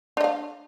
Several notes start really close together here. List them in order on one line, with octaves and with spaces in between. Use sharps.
D4 D#5 F5